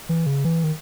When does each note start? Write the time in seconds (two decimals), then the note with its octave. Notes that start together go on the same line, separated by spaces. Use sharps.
0.09 E3
0.26 C#3
0.44 E3
0.64 D#3